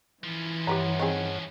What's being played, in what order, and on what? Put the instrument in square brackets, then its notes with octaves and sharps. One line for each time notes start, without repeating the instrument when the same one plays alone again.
[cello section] E3 [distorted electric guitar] F3 C#4
[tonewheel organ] G2 C#5 F#5 [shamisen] G4 B4 A#5
[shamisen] D#3 C4 G#4